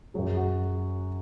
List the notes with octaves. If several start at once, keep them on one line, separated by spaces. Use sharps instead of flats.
F#2 F#3 G#4
F#4